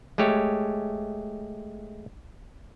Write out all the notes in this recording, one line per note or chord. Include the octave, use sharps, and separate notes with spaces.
G#3 A3 G4 C#5